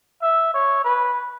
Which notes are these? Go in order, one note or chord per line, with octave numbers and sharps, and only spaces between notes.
E5
C#5
B4